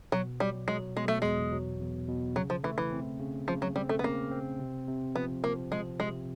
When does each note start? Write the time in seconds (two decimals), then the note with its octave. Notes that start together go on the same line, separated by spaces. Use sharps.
0.12 B2 F#3
0.40 F#3 G3
0.68 F#3 G#3
0.97 B2 G#3
1.08 A3
1.22 E2 G#3
1.52 F#3
1.80 E2
2.08 B2
2.36 C#3 F#3
2.50 F3
2.64 E3 A3
2.78 E3
2.92 C4
3.20 C#3
3.47 C#3 F3
3.62 F#3
3.76 G3 C4
3.89 A3
3.99 B3
4.04 C#3 A#3
4.31 C4
4.60 C3
4.88 C3
5.15 F3 B3
5.43 F3 A#3
5.71 F3 G#3
5.99 C3 G#3